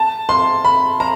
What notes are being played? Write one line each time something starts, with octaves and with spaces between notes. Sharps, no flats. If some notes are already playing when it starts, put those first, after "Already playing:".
Already playing: A5
C6
B5
A#5